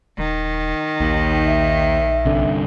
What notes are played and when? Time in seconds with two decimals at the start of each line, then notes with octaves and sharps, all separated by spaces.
0.18 D#1 D#3
1.00 A#1 D#2
1.46 E5
2.25 C2 G2 D3